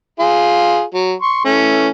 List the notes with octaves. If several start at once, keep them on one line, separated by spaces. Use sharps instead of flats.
F4 G#4
F#3
C6 C#6
E3 A3 C#4